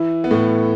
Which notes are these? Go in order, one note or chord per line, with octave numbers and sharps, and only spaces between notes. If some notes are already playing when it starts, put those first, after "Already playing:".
Already playing: E3 E4
B3
A2 A3